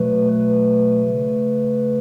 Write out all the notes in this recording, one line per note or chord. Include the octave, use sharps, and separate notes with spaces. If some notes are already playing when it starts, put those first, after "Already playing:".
Already playing: B2 F#3 A3 B4
B4
C#3 A3